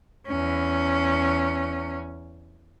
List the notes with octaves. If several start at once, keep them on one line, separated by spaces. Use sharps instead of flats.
E2 C#4